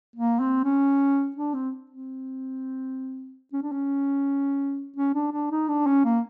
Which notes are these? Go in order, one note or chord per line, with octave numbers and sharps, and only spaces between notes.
A#3
C4
C#4
D4
C4
C4
C#4
D4
C#4
C#4
D4
D4
D#4
D4
C#4
A#3